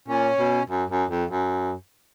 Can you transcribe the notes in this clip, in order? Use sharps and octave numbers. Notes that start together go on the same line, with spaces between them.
A#2 C#4
B2
F#2
F#2
F2
F#2